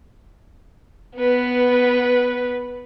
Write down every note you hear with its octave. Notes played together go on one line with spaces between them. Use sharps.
B3 B4